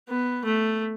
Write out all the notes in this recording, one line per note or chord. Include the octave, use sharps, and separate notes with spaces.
B3
A3